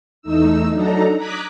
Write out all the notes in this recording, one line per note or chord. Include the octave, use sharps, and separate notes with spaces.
E2 A3 D#4 E6
F#3 D4 D#4 A4 A#5
A#5 D6 D#6 F#6 G#6 B6